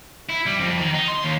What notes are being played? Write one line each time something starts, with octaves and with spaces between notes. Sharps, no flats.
E4
G3
F2
D#3
D#4
C6
D#2